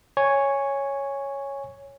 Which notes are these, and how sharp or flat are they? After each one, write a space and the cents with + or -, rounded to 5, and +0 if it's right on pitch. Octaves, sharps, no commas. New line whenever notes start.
C#5 +0 G#5 -10